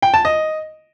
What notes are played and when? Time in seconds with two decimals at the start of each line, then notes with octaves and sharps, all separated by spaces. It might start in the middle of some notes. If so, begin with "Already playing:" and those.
0.02 G5
0.14 A5
0.25 D#5